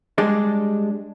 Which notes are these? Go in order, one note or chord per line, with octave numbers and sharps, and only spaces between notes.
G3 G#3 D4